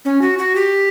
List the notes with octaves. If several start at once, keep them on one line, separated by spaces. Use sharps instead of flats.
C#4
F#4
F#4
G4